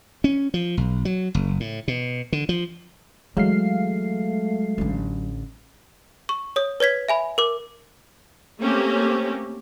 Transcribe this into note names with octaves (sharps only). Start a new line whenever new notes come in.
C#4
F3
B1
F#3
F#1
A2
B2
D3
F3
E3 F#3 G#3 A3 F5 C7
A1 D3
C#6
C#5 D#6
B4 C#5 G#6 B6
E5 G#5 B5
A#4 D6
A3 A#3 C4 C#4 G4